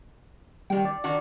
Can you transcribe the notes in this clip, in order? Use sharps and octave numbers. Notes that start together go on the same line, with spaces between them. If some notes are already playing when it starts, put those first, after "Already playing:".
D#3 G3 G5
D5
D#3 D4 F#4